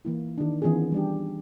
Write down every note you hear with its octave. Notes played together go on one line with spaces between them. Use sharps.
E3 A#3 E4
D#3 D4
D#3 E3 B3 C#4 F4 G#4
G3 D4 G4